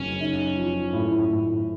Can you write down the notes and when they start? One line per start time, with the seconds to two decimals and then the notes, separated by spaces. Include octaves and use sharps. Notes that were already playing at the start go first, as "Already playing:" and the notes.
Already playing: F#1 C#4
0.20 D#4
0.57 F3
0.93 A2
1.30 A2